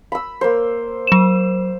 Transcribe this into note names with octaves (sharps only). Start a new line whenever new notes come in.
B5 E6
A#3 C5
F#3 E7